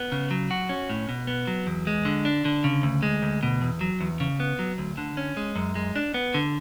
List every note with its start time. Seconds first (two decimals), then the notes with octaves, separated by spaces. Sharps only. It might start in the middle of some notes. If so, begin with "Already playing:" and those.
Already playing: B3
0.12 C#3
0.31 F#3
0.51 F#4
0.69 C#4
0.90 A2
1.09 B2
1.27 B3
1.47 F#3
1.67 E2
1.87 G#3
2.05 D3
2.25 D4
2.45 D3
2.64 C#3
2.83 D2
3.03 G#3
3.23 D2
3.43 B2
3.62 E2
3.81 F#3
4.00 E2
4.20 C#3
4.40 B3
4.59 F#3
4.78 D2
4.98 D3
5.17 C#4
5.37 G#3
5.56 F#2
5.75 G#3
5.96 D4
6.14 B3
6.34 D3